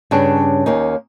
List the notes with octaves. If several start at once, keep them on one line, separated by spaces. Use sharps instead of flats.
G2 C#3 C#4 D4
D#2 A#3 C#4 D#4